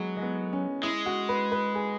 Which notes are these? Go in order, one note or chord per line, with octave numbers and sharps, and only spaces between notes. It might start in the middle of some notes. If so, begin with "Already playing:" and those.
Already playing: F#3 G#3 B3
G#3
B3
C#4
G#3 E4
F#4
B4
B4
G#4